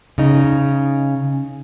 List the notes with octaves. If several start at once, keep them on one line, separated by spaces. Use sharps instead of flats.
C#3 D#4